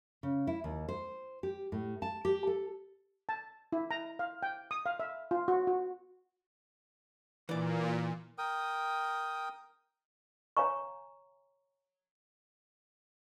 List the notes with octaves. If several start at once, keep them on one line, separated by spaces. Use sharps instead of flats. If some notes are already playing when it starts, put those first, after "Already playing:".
C#3
E4
D#2
C5
G4
A2
A5
G4
A4
A5
E4
A#5
F5
G5
D#6
F5
E5
F4
F#4
F#4
A#2 E3 D5
A#4 G5 D#6
C#5 F5 G#5 A#5 C#6